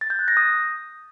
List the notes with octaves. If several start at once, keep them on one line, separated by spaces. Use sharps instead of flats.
A6
G6
F#6
A#6
D#6